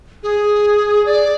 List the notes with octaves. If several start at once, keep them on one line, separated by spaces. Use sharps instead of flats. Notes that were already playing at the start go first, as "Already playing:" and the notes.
G#4
D5